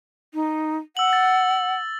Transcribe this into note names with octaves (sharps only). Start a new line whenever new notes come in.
D#4
F#5 E6 F#7
A6